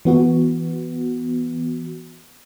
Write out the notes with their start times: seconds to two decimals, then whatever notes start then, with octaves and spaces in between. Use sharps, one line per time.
0.05 E3 B3 F#4